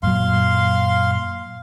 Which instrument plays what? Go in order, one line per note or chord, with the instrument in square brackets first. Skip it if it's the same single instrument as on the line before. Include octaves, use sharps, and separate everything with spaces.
[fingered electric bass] F#2 A#2 F#3 [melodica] F5 C6